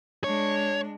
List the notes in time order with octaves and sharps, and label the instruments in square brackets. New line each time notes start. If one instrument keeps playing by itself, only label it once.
[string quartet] G#3 D4 [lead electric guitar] C#5